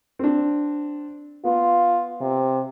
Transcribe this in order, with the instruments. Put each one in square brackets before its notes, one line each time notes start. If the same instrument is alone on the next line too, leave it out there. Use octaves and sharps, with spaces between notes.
[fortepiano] C4 D4
[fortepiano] B3 [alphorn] F4
[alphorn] C3